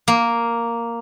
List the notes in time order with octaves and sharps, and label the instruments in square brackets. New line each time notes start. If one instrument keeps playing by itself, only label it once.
[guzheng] A#3